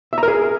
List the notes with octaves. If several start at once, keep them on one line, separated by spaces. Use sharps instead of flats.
E5
A#5
A#4
G#4